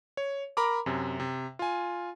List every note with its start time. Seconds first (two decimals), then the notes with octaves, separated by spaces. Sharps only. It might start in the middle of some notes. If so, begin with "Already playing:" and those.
0.17 C#5
0.57 A#4 A#5 B5 D6
0.86 F#2 C3
1.20 C3
1.59 F4 G#5